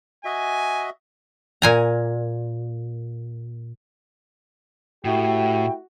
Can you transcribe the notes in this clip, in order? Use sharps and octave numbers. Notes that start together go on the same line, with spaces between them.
F#4 D#5 E5 G#5
A#2 G#5 A#5
A2 A3 E4 F#4 G4 G5